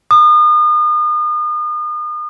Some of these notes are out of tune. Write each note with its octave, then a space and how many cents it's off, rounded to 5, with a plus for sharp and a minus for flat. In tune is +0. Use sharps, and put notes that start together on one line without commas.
D#6 -40